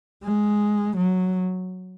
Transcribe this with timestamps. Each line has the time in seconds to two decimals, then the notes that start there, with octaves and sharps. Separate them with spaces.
0.23 G#3
0.96 F#3